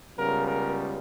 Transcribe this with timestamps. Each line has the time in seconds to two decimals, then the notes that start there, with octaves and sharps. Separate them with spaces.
0.18 C#2 C#3 G3 B3 A#4
0.48 A#4